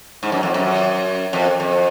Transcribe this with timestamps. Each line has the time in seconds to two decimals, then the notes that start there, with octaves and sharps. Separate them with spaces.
0.23 G#2
0.32 F#2
0.43 F2
0.54 F#2
1.33 F2
1.60 F2